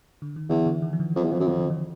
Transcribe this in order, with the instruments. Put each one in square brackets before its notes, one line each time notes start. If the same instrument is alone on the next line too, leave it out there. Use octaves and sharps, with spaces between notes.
[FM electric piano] D3
D#3
[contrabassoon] E2 [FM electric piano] D3 E3
[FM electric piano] D3
D#3
F3
D3 E3
[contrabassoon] F2 [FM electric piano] E3 F#3
[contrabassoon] E2
[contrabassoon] F2 [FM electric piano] D#3 F3
[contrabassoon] F#2
[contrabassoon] F2 [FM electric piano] D#3 F3
[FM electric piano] D3 E3
D#3